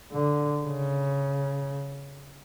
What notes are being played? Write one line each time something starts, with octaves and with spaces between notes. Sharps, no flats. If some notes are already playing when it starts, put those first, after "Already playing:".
D3
C#3